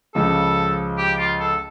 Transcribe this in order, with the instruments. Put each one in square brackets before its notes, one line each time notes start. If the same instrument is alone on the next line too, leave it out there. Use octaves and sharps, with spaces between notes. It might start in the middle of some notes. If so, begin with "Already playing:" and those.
[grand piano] C#2 C#3 F3 [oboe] A4
[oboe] G4
F4
A4